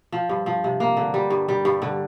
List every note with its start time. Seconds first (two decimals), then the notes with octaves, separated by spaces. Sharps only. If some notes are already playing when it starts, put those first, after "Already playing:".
0.12 F3
0.29 G2
0.46 F3
0.64 C3
0.80 A#3
0.97 D3
1.14 G3
1.30 G2
1.48 G3
1.65 G2
1.82 D3